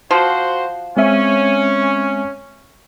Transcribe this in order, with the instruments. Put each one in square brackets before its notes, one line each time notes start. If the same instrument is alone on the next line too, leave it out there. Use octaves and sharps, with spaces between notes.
[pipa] F3 [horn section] F#4 C5
[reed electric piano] G#3 C4 E5 [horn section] C#4